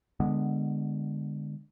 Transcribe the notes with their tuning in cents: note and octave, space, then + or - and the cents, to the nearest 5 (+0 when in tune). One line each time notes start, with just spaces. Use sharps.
D3 +10 G#3 -10 B3 +10